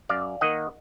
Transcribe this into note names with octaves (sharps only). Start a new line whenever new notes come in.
F#2 D5 F5
D#3 A#3 D#5 F#5